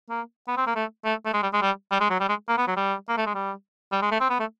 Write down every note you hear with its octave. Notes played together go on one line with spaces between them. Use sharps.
A#3
B3
C4
A#3
A3
A3
A3
G#3
G3
G#3
G3
G3
G#3
F#3
G3
G#3
A#3
B3
F#3
G3
A#3
A3
G#3
G3
G3
G#3
A3
C4
B3
A3